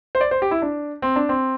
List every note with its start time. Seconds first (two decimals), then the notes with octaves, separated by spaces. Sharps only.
0.15 C5
0.21 D5
0.31 C5
0.42 G4
0.51 E4
0.62 D4
1.02 C4
1.16 D4
1.29 C4